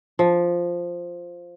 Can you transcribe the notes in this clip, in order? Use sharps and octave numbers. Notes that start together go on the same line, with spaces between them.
F3